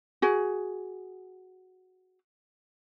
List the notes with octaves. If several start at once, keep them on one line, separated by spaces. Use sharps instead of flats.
F#4 G#4